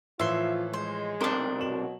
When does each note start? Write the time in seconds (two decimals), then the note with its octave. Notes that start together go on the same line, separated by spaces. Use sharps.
0.20 A2 E3 F3 F4 E5 C6
0.73 G#3 C5
1.21 B1 C3 D4 A#4 C5
1.61 B2 F#3 E7 F#7